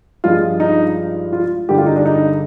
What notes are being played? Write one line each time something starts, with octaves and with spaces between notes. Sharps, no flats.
G2 F3 G#3 F4
D#4
F4
G2 D3 G#3 G4
F4
D#4
D4
D#4